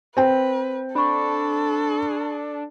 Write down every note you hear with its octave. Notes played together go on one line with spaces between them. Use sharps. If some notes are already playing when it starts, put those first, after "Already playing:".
C4 B4 G5
D4 A4 B5 C#6